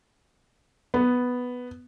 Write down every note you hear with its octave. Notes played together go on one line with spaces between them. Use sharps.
B3